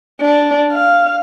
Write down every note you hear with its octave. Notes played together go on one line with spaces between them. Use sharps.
D4
F5